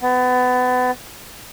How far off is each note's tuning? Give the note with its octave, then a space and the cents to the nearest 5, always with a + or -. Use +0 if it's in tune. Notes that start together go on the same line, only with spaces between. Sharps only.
B3 +30